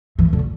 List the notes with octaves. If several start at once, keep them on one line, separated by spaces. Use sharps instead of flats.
E3
D3